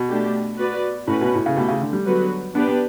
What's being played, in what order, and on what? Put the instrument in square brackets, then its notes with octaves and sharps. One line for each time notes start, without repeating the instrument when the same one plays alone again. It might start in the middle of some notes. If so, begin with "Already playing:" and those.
Already playing: [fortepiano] B2
[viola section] A3 D4 G4
B3 F#4 B4 D5
[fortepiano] A2 [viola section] A3 C#4 F#4 B4
[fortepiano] B2
A2
C#3
[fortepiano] B2 [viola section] A3 E4 G4
[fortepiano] C#3
D3
G3
[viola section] D3 F#3 B3 F#4 B4
[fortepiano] B3 [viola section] D4 G4 B4
[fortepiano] B3